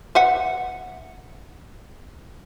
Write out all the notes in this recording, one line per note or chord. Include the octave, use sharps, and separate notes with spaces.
B4 E5 F#5